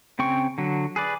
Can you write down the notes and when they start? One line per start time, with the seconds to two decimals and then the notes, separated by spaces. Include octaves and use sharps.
0.19 C#3 C4 G5 C#6
0.58 D3 F#3
0.96 G#4 B4 D5